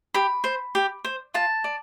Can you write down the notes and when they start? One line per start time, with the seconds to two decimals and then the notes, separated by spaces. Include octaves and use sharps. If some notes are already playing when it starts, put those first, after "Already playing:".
0.14 G4 B5
0.44 C5
0.75 G4
1.04 C5
1.34 F4 A5
1.64 D5